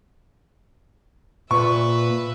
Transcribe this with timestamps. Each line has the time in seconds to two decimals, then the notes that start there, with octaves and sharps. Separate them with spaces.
1.51 A#2 B4 E5 C#6